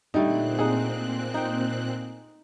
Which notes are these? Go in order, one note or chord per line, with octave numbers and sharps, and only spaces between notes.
A#2 D3 G3 A3 C4 D#4 F#6
D#4 G#4 F#5
D#4 G5